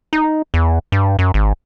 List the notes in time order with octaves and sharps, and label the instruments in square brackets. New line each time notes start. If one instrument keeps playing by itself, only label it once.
[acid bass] D#4
E2
G2
F#2
G#1